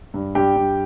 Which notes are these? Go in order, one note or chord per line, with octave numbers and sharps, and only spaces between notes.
G2
G2 G4 G5
G2